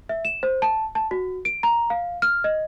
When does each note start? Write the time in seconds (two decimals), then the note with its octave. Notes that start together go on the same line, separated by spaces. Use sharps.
0.09 E5
0.25 E7
0.43 C5
0.62 A5
0.95 A5
1.11 F#4
1.45 D7
1.63 A#5
1.90 F5
2.22 F6
2.44 D#5